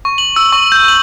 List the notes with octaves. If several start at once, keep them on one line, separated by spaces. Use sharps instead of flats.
C#6
F#7
E6
C#6
G6
F#7